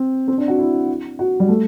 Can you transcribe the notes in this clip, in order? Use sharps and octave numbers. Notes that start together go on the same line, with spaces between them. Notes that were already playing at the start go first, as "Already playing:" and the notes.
Already playing: C4
C4
D4
F#4
E4
F#4
G3
A3